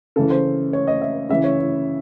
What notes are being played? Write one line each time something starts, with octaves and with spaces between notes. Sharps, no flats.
C#3 E3 A4
C5
C#5
D#5
E5
C#3 E3 E5
C#5
E4